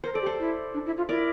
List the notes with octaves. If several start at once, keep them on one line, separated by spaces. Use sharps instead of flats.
A#4 C5
A4 D5
G4
A4 C5
E4
D4
E4
F4
E4 A#4 D5